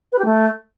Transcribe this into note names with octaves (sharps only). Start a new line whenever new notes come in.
B4
G4
A3